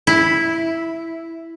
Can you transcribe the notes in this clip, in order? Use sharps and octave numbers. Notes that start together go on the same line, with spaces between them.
E4